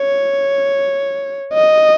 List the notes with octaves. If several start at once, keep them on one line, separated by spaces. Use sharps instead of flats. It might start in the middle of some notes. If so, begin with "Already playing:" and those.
Already playing: C#5
D#5